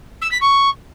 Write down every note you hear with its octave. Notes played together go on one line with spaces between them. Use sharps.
E6
B6
C#6